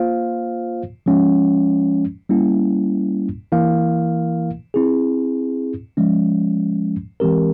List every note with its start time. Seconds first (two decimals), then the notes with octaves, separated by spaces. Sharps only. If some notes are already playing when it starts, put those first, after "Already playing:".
Already playing: A#3 F4 C5 F5
1.06 F3 G#3 C#4
2.29 G3 A#3 C#4 E4
3.52 E3 A#3 E4 A#4 F5
4.74 C4 E4 G#4
5.97 F3 G#3 C#4
7.20 E3 G#3 C4 G4 A#4